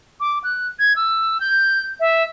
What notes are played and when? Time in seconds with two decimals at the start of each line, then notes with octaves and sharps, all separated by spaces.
0.20 D6
0.44 F#6
0.79 G#6
0.96 E6
1.40 G6
2.00 E5